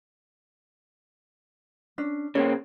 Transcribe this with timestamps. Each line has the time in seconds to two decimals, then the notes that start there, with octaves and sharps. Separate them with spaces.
1.98 C#4 D4
2.35 C#3 A#3 C4 C#5